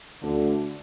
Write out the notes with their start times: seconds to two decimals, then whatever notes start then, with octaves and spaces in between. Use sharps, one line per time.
0.22 D2 D3